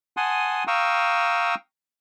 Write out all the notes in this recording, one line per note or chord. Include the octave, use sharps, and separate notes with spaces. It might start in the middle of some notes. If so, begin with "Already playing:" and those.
F#5 G#5 A5 C6 D#6
F5 G5 A#5 C#6 D#6 E6